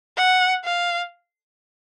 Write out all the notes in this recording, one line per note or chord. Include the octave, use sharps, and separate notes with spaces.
F#5
F5